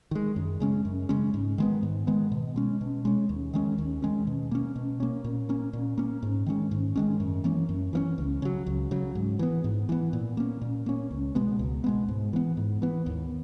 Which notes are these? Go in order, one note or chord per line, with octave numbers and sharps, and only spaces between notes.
D#3 G#3
F#2
C#3 G#3 C#4
F#2
C#3 G#3 C#4
G#2
D#3 G#3 B3
G#2
D#3 G#3 B3
B2
G#3 C#4
B2
G#3 C#4
D#2
D#3 G#3 C#4
D#2
D#3 G#3 C#4
B2
A#3 C#4
B2
A#3 C#4
A#2
A#3 C#4
A#2
A#3 C#4
G#2
D#3 G#3 C#4
G#2
D#3 G#3 C#4
F#2
E3 A#3 C#4
F#2
E3 A#3 C#4
C#2
C#3 F#3
C#2
C#3 F#3
G#2
E3 B3
G#2
E3 B3
A#2
A#3 C#4
A#2
A#3 C#4
C#2
B2 G#3 B3
C#2
B2 G#3 B3
G#2
E3 B3
G#2
E3 B3
D#2